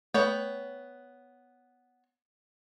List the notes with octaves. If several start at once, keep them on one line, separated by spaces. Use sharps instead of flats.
A3 B3 B4 C#5 G5